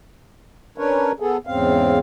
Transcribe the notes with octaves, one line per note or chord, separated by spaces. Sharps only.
C#4 D4 A#4 B4 C#5
B3 G#4 A4
E2 G#2 C#3 C4 F5